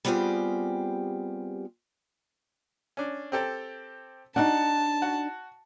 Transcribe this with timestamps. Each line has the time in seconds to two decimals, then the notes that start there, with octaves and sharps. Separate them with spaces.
0.05 G3 B3 C4 F4 G4 G#4
2.97 C#4 D4
3.32 C4 G4 A4
4.36 D4 D#4 F#4 F#5 A5
5.02 F#4